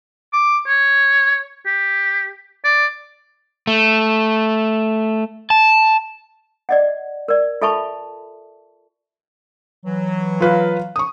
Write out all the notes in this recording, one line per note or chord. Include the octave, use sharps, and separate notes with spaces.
D6
C#5
G4
D5
A3
A5
D5 D#5 F#5
A#4 D5
F4 A4 E5 A5 B5 C#6
E3 F#3
F4 B4 F5
C#6 D#6